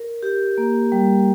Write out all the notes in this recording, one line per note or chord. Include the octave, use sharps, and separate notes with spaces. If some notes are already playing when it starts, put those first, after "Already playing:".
Already playing: A#4
G4
A#3
G3